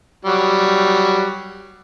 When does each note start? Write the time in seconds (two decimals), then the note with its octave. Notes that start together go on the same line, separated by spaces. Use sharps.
0.25 F#3 G3